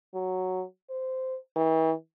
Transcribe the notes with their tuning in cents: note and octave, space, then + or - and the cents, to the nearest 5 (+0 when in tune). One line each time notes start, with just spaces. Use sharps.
F#3 +0
C5 -10
E3 -40